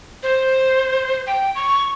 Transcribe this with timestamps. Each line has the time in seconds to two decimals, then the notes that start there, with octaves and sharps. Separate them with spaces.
0.23 C5
1.27 G5
1.55 C#6